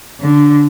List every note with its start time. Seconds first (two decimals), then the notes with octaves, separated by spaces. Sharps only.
0.21 D3